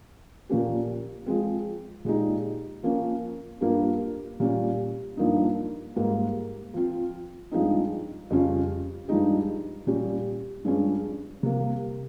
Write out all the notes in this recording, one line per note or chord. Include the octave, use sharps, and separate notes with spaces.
A#2 F3 A#3 C#4 G4
F3 G#3 C4
A#2 G#3 D#4 G4
F3 A#3 C#4
G2 G3 A#3 F4
A#2 G3 C#4 G4
G2 F3 A#3 D#4
G#2 G3 A#3
F3 C4 F4
G2 F3 G#3 C4 D#4
F2 C#3 G3 C#4 F4
G2 F3 G#3 D#4 G4
A#2 G3 C#4 G4
G2 F3 G#3 C#4
C3 G3 A#3